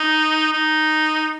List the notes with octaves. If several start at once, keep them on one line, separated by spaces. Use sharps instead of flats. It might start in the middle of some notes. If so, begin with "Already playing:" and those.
Already playing: D#4
D#4